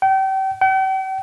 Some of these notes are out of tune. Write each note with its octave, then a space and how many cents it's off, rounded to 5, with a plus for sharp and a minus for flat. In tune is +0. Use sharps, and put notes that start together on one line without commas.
G5 -35
G5 -45